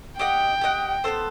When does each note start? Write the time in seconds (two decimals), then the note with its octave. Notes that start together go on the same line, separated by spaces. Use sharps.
0.19 G4 D#5 F#5 G5
0.61 G4 D#5 F#5
1.04 B3 E4 A4 C5